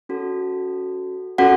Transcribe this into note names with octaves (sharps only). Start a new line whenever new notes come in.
C#4 F#4 A4
C#4 F4 F#4 A4 F#5